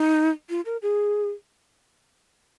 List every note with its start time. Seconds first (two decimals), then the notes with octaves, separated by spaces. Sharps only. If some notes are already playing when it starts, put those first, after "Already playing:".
Already playing: D#4
0.50 F4
0.65 A#4
0.82 G#4